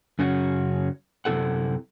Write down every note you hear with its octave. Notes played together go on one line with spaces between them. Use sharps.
F#2 C#3 C#4 F#4
F#2 C3 E4 A4 F#5